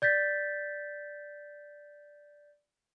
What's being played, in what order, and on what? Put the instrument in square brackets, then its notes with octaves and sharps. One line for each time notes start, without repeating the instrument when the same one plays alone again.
[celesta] D5 G6 A6 B6